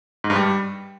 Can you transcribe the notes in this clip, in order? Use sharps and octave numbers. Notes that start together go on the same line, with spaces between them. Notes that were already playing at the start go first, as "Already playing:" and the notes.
G#2
G2
G3